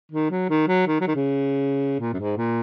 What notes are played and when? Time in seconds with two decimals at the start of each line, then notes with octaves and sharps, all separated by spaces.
0.12 D#3
0.31 F#3
0.50 D#3
0.68 F#3
0.87 D#3
1.01 F#3
1.07 D#3
1.15 C#3
2.00 A#2
2.14 F#2
2.19 G#2
2.37 A#2